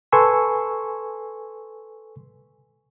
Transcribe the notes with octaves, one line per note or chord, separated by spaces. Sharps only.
A4 B4 G#5 C6 C#6 E6